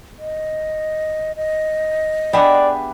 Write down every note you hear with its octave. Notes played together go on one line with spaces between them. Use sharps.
D#5
D#5
B3 D4 G4 G#4 D5 E5 F#5